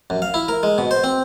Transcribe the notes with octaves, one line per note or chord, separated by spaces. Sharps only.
F#2
F5
E4
A#4
G#3
B2
C5
C4